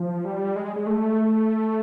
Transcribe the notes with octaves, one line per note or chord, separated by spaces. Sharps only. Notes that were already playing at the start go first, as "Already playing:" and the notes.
Already playing: F3
G3
G#3
G#3
A3